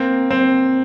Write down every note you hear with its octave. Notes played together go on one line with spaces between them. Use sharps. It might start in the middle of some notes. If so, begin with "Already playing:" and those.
Already playing: A#3 C4
C4